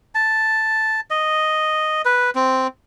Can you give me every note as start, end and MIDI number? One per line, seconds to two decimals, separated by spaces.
0.15 1.01 81
1.10 2.02 75
2.05 2.30 71
2.35 2.67 60